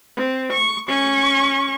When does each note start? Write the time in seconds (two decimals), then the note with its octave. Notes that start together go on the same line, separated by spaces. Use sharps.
0.17 C4
0.53 C#6
0.88 C#4 C#6